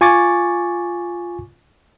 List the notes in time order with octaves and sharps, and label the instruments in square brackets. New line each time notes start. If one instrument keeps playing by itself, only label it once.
[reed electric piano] F4 G#5 C#6 D6 A6